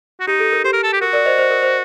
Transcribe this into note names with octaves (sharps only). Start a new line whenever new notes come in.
F#4
D#4 G4
A4
A#4
G4 C5
A#4
A4
G4
F#4 A#4
A#4 D5
C5 D#5
C5
A#4
C5